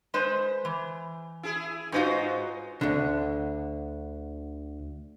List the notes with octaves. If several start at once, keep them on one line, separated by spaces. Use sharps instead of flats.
G#3 B4 C5
E3
E4 G#4
G#2 D#4 F4 F#4 B4 C5
D2 D3